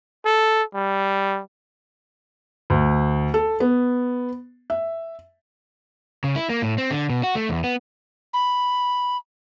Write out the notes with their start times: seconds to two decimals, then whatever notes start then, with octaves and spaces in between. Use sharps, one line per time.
0.25 A4
0.74 G3
2.70 D2
3.34 A4
3.60 B3
4.70 E5
6.24 C#3
6.36 E4
6.50 A#3
6.62 A2
6.78 C4
6.91 D3
7.10 B2
7.23 F#4
7.35 A3
7.50 E2
7.64 B3
8.33 B5